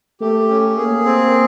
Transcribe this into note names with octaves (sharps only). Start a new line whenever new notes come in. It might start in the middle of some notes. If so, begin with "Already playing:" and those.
A3 G4
C#4
A#3 G#4
C4